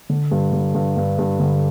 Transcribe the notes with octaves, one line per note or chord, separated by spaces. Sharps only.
D3
G2
D3
G2
G2
G2
D3